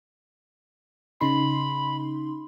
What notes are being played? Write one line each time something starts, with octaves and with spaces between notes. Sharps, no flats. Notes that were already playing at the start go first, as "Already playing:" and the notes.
C#3 D#4 B5 C6